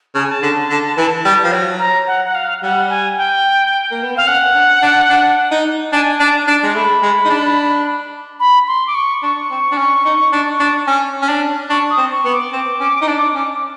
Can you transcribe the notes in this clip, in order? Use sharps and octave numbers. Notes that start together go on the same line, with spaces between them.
C#3 A5
G#5
A5
D3
D3
E3
G3
F3
F#3
A#5
F#5
F#5
F5
G3 F#5
G#5
G5
A#3
B3
C4 F5
C#4 F#5
D4
D4
D4
D#4
D4 G#5
D4 A5
D4 A5
G#3
A3 B5
G#3
D#4
D4
B5
C6
D6
C#6
D4 C#6
C4
D4
C#4
D#4
D4
D4
C#4
C#4
D4
D4 C#6
D#6
C4
C#6
B3
D6
C4
C#4
D#4
D4
C#4